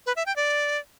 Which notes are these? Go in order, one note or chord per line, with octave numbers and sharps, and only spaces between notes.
B4
E5
G5
D5